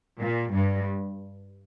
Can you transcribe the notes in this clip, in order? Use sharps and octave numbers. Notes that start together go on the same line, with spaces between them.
A#2
G2